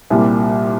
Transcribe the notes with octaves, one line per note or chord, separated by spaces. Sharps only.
C2 A#2 G3